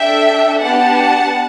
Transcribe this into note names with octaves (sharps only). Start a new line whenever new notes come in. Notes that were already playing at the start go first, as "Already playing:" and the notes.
Already playing: D4 A4 E5 G5
B3 D4 G4 F#5 A5